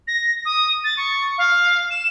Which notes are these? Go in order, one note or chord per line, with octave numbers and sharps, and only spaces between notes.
A#6
D#6
A6
C#6
F5
E7